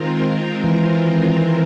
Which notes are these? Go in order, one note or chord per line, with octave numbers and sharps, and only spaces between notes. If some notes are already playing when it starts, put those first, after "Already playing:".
Already playing: D#3 G#3 C4 F4 A#4
E3